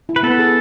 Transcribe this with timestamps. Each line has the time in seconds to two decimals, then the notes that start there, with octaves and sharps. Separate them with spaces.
0.09 E4
0.16 B4
0.23 B3 A4
0.39 G#4